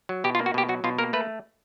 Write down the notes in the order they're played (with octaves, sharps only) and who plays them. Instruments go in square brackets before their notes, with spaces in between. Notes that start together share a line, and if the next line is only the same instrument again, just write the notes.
[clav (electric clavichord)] F#3
B2 G4
F4
A#3
F#4
B2 G4
F#3 F#4
B2 F4
A#3 A#4
A3 B4